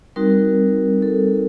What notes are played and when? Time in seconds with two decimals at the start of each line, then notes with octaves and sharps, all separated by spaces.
0.16 G3 C4 D#4 F#4 A#4
1.02 A4